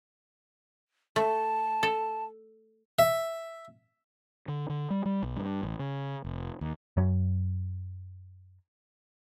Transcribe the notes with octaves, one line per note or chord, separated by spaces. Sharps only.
A3 A5
A4
E5
D3
D3
G3
G3
B1
G2
A1
C#3
F1
D#2
F#2 F#3